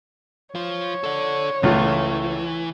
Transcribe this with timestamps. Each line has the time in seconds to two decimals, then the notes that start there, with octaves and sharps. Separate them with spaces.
0.55 F3 F4 C#5
1.04 A4 D5
1.63 C#2 E3 A3 F4